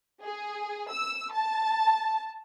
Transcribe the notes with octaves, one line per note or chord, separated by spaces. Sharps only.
G#4
E6
A5